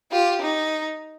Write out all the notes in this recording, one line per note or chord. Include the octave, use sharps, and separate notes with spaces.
F4 G4
D#4